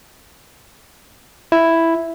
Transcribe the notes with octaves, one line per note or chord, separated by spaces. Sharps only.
E4